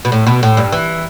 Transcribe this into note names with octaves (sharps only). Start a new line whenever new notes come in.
B2
A2
B2
A2
G2
E3